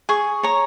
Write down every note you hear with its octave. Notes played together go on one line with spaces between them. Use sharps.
G#4 C#6
C#5 A#5